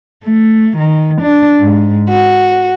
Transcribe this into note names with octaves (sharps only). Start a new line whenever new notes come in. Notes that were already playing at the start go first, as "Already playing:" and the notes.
A3
D#3
D4
G#2
F#4